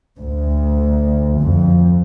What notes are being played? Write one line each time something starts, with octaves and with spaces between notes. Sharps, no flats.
D2
F2